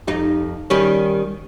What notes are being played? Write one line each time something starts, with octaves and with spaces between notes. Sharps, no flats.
F2 D#4 G4
D#3 G3 C#4